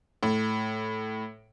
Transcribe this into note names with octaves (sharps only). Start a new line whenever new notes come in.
A2